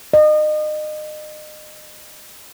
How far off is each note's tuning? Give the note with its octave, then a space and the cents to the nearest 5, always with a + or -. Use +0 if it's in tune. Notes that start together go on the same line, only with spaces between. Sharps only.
D#5 -30